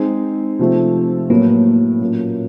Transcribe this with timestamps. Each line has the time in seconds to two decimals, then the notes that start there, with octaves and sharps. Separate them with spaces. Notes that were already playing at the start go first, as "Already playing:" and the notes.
Already playing: G#3 C4 D#4 G#4
0.59 C3 F3 A3 C4
1.30 A2 F#3 A#3 B3
2.01 A#2 F#3 A#3 C#4